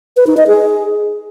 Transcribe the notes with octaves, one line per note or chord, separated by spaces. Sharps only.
B4
D#4
D#5
G#4